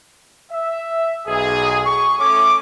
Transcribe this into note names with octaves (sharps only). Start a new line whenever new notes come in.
E5
B1 G#4
C#6
A3 C#4 D6